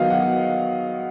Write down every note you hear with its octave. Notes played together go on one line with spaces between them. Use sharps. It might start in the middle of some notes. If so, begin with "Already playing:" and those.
Already playing: D#3 F#3 B3 D#5 F5
F#5